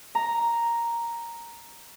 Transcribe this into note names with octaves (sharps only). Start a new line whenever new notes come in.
A#5